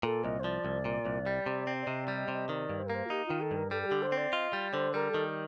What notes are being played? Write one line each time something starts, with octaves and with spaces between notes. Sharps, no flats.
A#2 A4
C2 D#5
C5
F3 D5
C2
A#2
C2
G3
C3
C4
D5
C3 D#5
G3 D5
D#5
C3
D#5
D#3 D5
G2
C5
A#4
A#3
C5
F4
D#4 G4
D#3 F4
A4
G2
A#4
G3 A4
A4
D3 G4
C5
C4
D5
F4 D#5
G3 D5
D3 C5
G3 A#4
A4
D#3